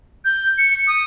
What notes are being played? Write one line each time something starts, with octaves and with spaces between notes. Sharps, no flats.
G6
C#7
D#6